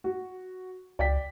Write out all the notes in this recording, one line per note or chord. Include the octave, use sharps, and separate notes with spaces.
F#4
C#2 D5 G5 B6